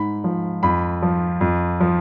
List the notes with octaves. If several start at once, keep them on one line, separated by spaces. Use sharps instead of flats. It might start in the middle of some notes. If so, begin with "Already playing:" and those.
Already playing: G#2 B5
F3
F2 B5
F3
F2
F3